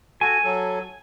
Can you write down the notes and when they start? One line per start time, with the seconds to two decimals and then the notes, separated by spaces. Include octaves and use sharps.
0.21 F#4 A4 G#5
0.44 F#3 A4